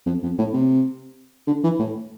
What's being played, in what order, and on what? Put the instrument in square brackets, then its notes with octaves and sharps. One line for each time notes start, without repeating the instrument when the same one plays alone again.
[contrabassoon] F2
F2
A2
C3
D3
E3
A2